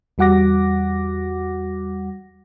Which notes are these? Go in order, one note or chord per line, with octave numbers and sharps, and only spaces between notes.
E2 G3 F#4 F#5 D6 A#6